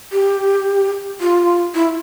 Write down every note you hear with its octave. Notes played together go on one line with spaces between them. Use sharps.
G4
F4
E4